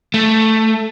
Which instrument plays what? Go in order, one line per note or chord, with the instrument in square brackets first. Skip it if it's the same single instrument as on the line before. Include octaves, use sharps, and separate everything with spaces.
[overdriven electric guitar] A3